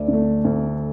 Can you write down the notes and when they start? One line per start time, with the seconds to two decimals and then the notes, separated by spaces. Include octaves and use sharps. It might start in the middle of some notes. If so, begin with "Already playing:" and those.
Already playing: D2 D5
0.08 D3 A3
0.44 D2